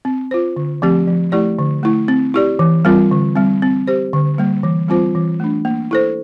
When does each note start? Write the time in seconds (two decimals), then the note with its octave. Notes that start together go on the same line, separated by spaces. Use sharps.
0.05 C4
0.31 F4 C5
0.56 D3
0.82 F3 A3 C4 G4
1.08 F3
1.32 A3 E4 G4 D5
1.59 D3
1.83 A3 E4
2.08 C4
2.34 E4 G4 D5
2.59 E3
2.85 G3 C4 F4 A#4
3.11 D3
3.36 G3 C4
3.62 C4
3.87 G4 C5
4.13 D3
4.38 G3 A#3
4.63 E3
4.88 G3 C4 F4 C5
5.15 E3
5.40 A3 D4
5.65 A#3
5.91 E4 A4 C5